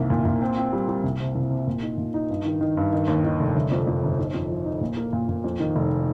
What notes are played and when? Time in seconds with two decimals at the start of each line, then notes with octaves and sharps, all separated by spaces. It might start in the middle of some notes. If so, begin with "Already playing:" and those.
Already playing: C2 D#3 A#3
0.10 A#2
0.25 A#2
0.41 C4
0.57 C4
0.73 G3
0.88 G3
1.03 C2
1.20 C3
1.35 C2
1.51 C3
1.67 A#2
1.83 D#4
1.98 A#2
2.14 D#4
2.30 G2
2.46 D#3
2.61 D#3
2.77 G2
2.93 D#3
3.08 D#2
3.24 D#3
3.40 F1
3.56 G1
3.71 F2
3.87 F2
4.03 G1
4.19 D#4
4.34 F2
4.50 F3
4.66 D#4
4.81 A#2
4.97 A#3
5.13 A#2
5.29 A#2
5.44 F2
5.60 D#3
5.76 F1